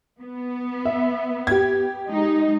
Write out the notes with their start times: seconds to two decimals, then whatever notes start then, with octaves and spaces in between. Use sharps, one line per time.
0.21 B3
0.85 E5
1.47 G4 G#6
2.07 G#3 D#4